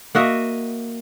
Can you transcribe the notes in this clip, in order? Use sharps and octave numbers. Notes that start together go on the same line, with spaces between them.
A#3 F#4 D#5 E5